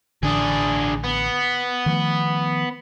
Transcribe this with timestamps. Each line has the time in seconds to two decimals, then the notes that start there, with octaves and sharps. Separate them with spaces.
0.23 A1 D3 D4 G#4
1.04 B3
1.86 D#3 F3 A3